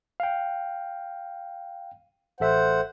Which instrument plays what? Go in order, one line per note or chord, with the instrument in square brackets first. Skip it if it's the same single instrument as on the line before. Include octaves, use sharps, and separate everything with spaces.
[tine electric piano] F5 G5
[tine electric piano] A1 A4 E5 [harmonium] C5 F#5